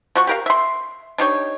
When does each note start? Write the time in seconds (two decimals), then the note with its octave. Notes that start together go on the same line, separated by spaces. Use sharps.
0.15 F3 F#4 C#6
0.27 G4 A#4 F5
0.46 E5 C6
1.18 D4 D#4 G4 C#5